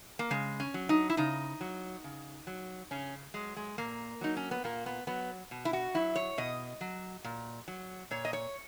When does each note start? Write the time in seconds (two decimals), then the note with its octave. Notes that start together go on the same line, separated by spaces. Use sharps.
0.19 A#3
0.31 C#3 G#3
0.60 C#4
0.74 F#3
0.89 D#4
1.10 E4
1.17 C#3 D#4
1.61 F#3
2.04 C#3
2.47 F#3
2.91 C#3 C#4
3.34 F#3 G#3
3.56 G#3
3.78 A#2 A#3
4.21 F#3 D#4
4.37 C#4
4.51 B3
4.64 A#2 A#3
4.86 B3
5.07 F#3 B3
5.51 B2
5.65 E4
5.73 F#4
5.94 F#3 E4
6.16 C#5
6.38 B2 D#5
6.81 F#3
7.24 A#2
7.68 F#3
8.11 A#2 C#5
8.25 D#5
8.33 C#5